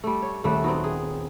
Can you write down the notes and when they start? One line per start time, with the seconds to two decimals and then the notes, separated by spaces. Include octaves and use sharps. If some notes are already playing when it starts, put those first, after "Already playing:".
0.04 G3 A3
0.22 C#5
0.44 D#1 G3 A3 E5 F#6
0.64 F#3 B3 C4 D#4
0.84 G#4